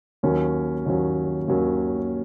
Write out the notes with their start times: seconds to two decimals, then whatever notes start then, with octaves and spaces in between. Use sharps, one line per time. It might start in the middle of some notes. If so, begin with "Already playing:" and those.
0.23 D#2 D#3 F#3 C#4
0.85 D#2 D#3 F#3 C#4
1.48 D#2 D#3 F#3 C#4